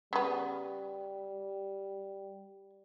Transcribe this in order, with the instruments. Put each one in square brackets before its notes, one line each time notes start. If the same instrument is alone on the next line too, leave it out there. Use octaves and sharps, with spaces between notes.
[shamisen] C#3 B3 [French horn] G3